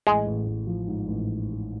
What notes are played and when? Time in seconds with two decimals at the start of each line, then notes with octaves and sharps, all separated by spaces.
0.07 A1 G#3
0.26 A1
0.46 A1
0.67 F3
0.87 G#2
1.08 A1